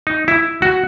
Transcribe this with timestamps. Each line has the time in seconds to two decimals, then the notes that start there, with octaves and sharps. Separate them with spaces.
0.07 D#4
0.28 E4
0.62 F#4